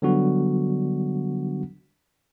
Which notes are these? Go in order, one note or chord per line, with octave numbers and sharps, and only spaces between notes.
D3 F#3 G3 B3 D4 F#4